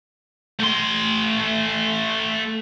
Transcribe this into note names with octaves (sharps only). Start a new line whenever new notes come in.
A3 C6